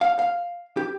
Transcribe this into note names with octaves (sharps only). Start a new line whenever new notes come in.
F5
F5
G4